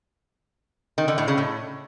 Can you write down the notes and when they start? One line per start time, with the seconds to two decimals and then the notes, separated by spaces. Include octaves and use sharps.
0.98 D#3
1.08 D3
1.18 A2
1.28 C#3
1.38 A2